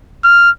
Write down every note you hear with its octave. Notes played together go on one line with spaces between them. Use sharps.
F6